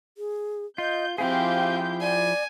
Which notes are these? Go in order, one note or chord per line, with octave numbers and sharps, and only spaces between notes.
G#4
F4 D#5 G6
F3 C4 E4 F4 G4 G#4 F5 G6
D5 G#5